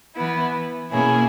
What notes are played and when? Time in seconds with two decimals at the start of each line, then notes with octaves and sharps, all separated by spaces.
0.14 E3 B3 E4
0.90 B2 A#3 C#4 E4 G#4